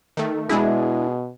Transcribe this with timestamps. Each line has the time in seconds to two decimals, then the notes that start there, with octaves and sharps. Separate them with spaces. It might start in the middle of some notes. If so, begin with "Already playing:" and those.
0.17 D#3 A3
0.49 B2 G#3 D4 E4 G#4